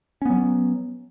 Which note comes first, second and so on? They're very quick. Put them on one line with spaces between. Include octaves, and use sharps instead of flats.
C#4 B3 F#3